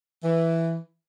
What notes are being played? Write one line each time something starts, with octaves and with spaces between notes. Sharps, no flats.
E3